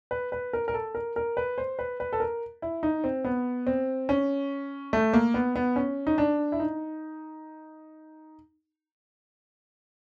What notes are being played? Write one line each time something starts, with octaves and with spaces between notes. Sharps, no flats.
B4
B4
A#4
A#4
A4
A#4
A#4
B4
C5
B4
B4
A4
A#4
E4
D#4
C4
B3
C4
C#4
A3
A#3
B3
B3
C#4
D#4
D4
E4
D#4